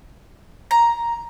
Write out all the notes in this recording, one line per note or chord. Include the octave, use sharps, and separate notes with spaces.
A#5